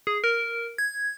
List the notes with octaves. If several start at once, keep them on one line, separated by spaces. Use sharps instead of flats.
G#4
A#4
G#6